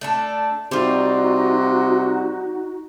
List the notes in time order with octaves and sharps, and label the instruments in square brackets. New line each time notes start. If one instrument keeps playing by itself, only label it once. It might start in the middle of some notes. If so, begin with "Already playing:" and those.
[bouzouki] A3 D4 A4
[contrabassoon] C3 [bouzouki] G3 F4 [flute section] D#4 F#4